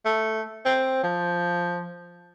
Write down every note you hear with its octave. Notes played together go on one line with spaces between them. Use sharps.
A3
C4
F3